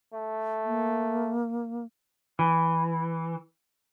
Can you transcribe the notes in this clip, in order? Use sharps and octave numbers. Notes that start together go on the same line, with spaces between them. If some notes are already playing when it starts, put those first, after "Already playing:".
A3
A#3
E3